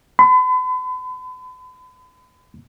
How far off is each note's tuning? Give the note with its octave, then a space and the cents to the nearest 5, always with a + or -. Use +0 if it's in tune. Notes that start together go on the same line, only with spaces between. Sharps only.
B5 +40